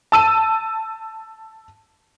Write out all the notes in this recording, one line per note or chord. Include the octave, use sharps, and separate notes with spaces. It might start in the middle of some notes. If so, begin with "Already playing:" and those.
A5 E6 D#7